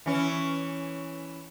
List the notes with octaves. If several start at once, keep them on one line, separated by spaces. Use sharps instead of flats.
E3 C#4